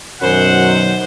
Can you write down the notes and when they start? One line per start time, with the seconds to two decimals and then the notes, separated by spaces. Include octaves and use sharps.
0.22 F#2 B2 D#3 F#3 C5 F#5